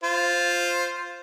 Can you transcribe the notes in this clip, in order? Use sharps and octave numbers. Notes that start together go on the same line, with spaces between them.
F4 C5